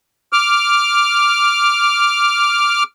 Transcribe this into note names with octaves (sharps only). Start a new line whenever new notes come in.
D6 F6